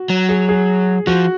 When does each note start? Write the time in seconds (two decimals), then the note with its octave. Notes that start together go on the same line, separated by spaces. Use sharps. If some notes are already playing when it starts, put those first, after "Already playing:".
Already playing: F#4
0.10 F#3
0.29 G#4
0.49 G#4
1.07 F3 F#4